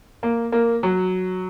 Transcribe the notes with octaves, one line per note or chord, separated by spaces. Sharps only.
A#3
A#3
F#3